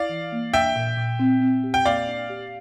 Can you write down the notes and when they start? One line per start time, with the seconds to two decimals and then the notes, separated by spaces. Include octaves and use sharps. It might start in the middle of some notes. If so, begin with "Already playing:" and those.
Already playing: E4 D5 F5
0.09 E3
0.32 A#3
0.53 D4 E5 G5
0.76 A#2
0.97 A#2
1.19 C4
1.41 C4
1.64 G4
1.74 G5
1.86 A#3 D5 F5
2.07 D4
2.30 G4